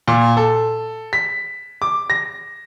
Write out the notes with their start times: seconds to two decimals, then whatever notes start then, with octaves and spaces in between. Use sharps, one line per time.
0.08 A#2
0.37 A4
1.13 B6
1.82 D6
2.10 A#6